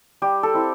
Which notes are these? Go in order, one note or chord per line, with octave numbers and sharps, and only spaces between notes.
G3 G4
A4
C4 E4